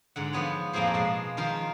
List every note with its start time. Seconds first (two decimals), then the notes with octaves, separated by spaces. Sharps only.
0.16 G#2 D3 F#5
0.33 F3 B3 C#5
0.73 F2 A2 A#3 F4 G#4 C5
0.94 B2 G#3 G#4 A5
1.37 D#3 F3 F4 A#4 C5